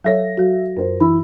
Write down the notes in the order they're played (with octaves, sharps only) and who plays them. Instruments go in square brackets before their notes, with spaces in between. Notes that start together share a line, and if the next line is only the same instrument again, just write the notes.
[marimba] F#3 A4 C#5 [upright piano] E5 A#6
[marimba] F#3 F#4
[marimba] F#2 [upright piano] A#4 C5
[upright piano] E3 E4 E6 [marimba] B5